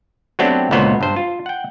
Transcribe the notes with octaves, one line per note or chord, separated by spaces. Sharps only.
F#3 A3 B3 C4 D4 G4
C#2 A#2 D3 F#3 B3 C5
G2 C5
F4
F#5 G5